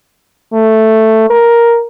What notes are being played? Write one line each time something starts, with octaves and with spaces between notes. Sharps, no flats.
A3
A#4